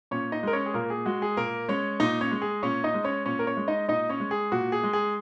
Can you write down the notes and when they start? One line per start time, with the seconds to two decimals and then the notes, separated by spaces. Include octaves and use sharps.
0.11 A#2 C#4 C#5
0.32 D#4 D#5
0.43 G#3 A#4
0.53 C#4 C#5
0.66 G#4
0.74 A#2 A#3 A#4
0.90 G#4
1.06 G#3 F#4
1.22 G#4
1.37 A#2 A#3 A#4
1.68 G#3 C#4 C#5
2.00 A#2 D#4 D#5
2.21 C#4 C#5
2.31 G#3
2.42 G#4
2.63 A#2 C#4 C#5
2.84 D#4 D#5
2.94 G#3
3.04 C#4 C#5
3.26 A#2 C#4 C#5
3.39 A#4
3.47 C#4 C#5
3.57 G#3
3.68 D#4 D#5
3.88 A#2 D#4 D#5
4.09 C#4 C#5
4.20 G#3
4.31 G#4
4.52 A#2 F#4
4.72 G#4
4.83 G#3
4.93 G#4